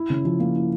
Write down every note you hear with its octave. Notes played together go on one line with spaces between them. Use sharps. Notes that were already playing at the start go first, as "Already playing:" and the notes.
Already playing: E4
C#3
F3
A#3
E4